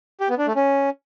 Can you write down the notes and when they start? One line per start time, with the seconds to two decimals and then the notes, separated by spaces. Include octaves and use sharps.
0.20 G4
0.29 B3
0.38 D4
0.47 A3
0.56 C#4